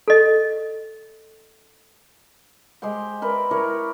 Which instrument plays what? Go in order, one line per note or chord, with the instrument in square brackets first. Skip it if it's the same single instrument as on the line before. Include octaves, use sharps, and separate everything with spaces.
[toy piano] A4 D#5
[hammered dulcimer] G#3 G4 C5 G5
A#4 B4 D5 E5
E4 A#4 C#5 D5